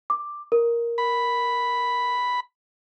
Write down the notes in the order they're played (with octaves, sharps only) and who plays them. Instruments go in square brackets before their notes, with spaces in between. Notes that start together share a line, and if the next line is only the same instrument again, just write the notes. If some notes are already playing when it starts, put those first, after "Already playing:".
[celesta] D6
A#4
[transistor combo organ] B5